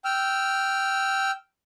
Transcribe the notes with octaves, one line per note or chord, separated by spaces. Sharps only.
G5 E6 F6